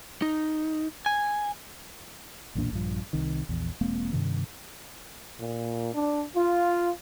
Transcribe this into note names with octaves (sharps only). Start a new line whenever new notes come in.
D#4
G#5
B1 E2 A#2 D4
A#1 G2 F3
C2 C3 D#3
A#1 E2
E1 G#3 A#3 C4
G2 C3 D#3
A#2
D4
F4